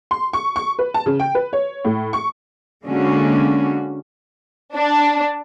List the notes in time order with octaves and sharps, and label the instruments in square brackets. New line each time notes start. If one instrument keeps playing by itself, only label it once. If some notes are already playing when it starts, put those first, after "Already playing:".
[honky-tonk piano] C6
C#6
C#6
B4
A5
C#3
G5
B4
C#5
A2
C#6
[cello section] D3 G#3 A#3 C#4 F#4
[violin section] D4